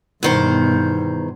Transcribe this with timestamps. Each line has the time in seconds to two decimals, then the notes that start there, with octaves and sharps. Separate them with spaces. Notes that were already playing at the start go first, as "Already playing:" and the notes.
0.23 E2 G2 B2 D#3 C5